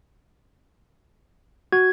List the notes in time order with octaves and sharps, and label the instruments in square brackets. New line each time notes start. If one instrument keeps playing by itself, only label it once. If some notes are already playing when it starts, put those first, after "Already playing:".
[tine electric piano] F#4 [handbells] G#6